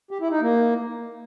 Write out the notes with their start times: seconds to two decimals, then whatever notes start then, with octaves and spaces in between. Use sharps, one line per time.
0.11 G4
0.21 E4
0.31 D#4
0.41 A#3